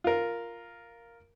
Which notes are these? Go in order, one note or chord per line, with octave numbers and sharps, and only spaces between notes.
F4 A#4